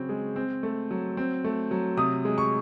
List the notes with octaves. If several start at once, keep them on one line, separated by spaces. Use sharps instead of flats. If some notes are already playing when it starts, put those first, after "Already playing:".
Already playing: C#3 F#3 C4
G#3
C4
A3
F#3
C4
A3
F#3
C3 D#6
G#3
C#6